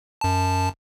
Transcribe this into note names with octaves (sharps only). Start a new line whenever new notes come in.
F#2 A5